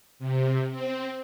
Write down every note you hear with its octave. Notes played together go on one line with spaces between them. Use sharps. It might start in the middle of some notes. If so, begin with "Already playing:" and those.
C3
C4